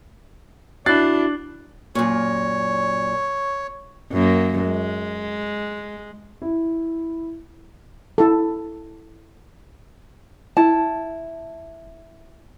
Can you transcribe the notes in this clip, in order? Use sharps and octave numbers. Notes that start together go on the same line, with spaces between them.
D4 E4 F#4 F#6 A6 C7
F#2 A#2 C#5
F#2 A#3
G#3
E4
E4 A4
E4 A5